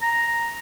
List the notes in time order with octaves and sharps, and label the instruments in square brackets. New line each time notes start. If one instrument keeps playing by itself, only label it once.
[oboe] A#5